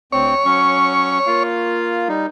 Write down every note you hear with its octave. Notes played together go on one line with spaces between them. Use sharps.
D2 C4 C#5
F#3 C#4 C#6
A#3 F4 F5
G3 D#4